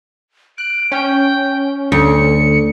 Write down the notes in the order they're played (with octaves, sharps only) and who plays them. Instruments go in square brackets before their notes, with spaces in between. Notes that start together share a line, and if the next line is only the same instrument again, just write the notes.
[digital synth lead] F#6 [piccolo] D7
[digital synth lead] C#4 [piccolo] G5
[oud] D2 [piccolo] C#7